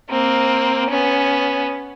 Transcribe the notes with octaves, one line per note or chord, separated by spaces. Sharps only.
A#3 C4
B3 C#4